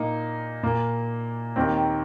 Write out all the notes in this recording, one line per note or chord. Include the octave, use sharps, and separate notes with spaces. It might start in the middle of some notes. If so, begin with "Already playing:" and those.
Already playing: A#2 A#3 D#4
A#2 A#3
D#2 D#3 A#3 C4